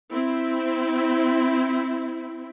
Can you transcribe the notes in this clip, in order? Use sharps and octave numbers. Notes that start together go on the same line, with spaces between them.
C4 E4